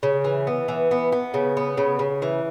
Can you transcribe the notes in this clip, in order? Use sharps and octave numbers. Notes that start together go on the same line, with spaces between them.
C#3
E3
B3
E3
B3
B3
C#3
B3
C#3
C#3
E3